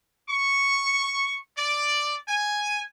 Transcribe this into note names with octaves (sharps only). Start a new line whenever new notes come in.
C#6
D5
G#5